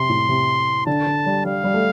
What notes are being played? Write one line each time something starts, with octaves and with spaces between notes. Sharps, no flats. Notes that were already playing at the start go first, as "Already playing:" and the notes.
Already playing: C3 C6
A2
C3
D3 A5
D3
G3
G3 F5
G3
A3